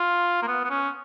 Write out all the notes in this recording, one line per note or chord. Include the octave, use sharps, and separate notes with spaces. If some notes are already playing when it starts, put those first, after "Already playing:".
Already playing: F4
A#3
B3
B3
C#4